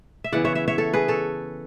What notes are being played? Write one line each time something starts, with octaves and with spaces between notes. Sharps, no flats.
E5
C#3 E3 B3 D5 F#5
C#5 E5
C#5 E5
C#5 E5
A4 C#5
G#4 B4
A4 C#5